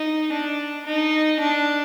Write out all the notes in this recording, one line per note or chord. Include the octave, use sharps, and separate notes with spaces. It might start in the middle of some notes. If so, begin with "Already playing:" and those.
Already playing: D#4
D4
D#4
D4